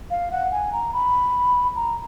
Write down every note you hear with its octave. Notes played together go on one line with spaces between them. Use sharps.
F5
F#5
G#5
A#5
B5
A#5